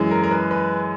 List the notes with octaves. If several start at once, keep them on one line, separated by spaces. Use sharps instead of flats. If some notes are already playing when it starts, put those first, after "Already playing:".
Already playing: F#2 E3 G#3
A#4
A#4
B4
B4